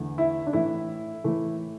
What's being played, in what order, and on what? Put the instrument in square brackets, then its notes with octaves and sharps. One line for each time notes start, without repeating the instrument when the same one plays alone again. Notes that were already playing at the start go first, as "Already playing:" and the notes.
Already playing: [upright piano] E2 D3 A3
E4
D4
A2 E3 A3 E4
A2 E3 A3